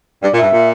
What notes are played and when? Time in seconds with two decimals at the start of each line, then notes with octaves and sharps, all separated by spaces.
0.23 G2 D5
0.33 A#2
0.37 G2 E5
0.53 A#2